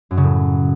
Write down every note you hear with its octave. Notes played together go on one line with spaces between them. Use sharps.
F#2
C#3
A2